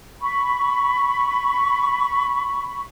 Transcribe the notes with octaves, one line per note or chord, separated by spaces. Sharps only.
B5 C#6